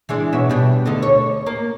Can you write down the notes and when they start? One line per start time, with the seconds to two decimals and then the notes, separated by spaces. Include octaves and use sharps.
0.09 E3 G#3 D4
0.33 B2 C#5 E5
0.50 B2 G3 D4
0.86 D2 D3 D#5
1.03 C#5
1.46 A#3